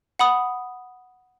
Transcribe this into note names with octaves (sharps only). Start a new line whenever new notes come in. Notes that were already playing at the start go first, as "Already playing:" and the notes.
F#5 B5 D#6